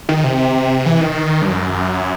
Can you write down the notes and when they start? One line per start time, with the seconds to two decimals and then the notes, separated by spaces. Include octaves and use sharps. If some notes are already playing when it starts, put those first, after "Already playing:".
0.09 D#3
0.24 C3
0.86 E3
1.01 D#3
1.42 G2
1.48 F#2